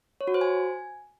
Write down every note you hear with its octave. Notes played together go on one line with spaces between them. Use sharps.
C#5
F#4
C5
G#5